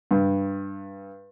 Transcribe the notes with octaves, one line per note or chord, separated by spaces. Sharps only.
G2